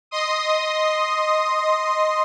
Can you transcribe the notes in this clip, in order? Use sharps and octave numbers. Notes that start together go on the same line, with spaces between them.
D#5 C6 D#6